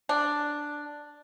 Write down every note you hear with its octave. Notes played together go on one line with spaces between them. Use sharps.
D4